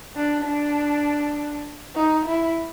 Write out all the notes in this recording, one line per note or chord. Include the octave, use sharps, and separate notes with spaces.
D4
D4
D#4
E4